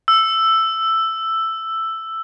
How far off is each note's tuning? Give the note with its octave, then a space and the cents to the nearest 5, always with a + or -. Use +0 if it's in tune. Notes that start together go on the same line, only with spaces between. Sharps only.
E6 +5